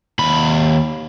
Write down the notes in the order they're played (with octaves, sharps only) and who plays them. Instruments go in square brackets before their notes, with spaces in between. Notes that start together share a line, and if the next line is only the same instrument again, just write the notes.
[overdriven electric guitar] D#2 B5